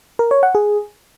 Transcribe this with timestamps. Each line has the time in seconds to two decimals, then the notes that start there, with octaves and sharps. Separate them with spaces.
0.19 A#4
0.31 C#5
0.43 F#5
0.55 G#4